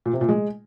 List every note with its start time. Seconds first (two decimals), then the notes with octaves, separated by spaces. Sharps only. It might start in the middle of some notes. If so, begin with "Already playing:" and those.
0.06 A#2
0.13 C3
0.21 A#2
0.29 G#3